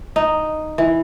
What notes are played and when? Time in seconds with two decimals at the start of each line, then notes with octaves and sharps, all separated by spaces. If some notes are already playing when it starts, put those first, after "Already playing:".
0.16 D#4
0.78 E3